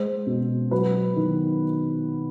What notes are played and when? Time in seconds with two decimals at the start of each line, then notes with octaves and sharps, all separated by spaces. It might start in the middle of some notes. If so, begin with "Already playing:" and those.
Already playing: G#3 C5
0.27 B2
0.71 F#3 B4
1.16 D#3